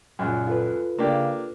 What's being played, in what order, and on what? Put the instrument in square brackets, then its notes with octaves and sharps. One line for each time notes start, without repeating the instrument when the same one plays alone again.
[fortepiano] C#2 F#2 [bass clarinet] A#2
[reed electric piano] F4 A4 B4
[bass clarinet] C#3 [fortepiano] A#3 D4 G4